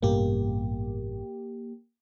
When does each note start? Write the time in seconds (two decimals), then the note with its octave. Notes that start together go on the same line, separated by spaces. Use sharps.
0.03 A1 G2 B2 A#3 G4